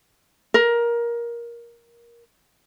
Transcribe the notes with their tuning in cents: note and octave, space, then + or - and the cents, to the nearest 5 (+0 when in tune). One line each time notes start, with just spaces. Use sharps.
A#4 +15